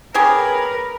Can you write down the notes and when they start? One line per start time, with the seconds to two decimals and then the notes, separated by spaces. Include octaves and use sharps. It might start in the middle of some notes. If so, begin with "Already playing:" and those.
0.14 C#4 G4 G#4 A#4 B4